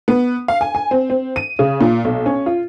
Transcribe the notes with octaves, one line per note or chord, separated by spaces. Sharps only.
B3
F5
G#5
G#5
C4
C4
D#7
C#3
A#2
B1
C#4
F4